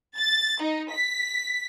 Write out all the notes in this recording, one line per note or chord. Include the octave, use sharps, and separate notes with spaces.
A6
D#4
B6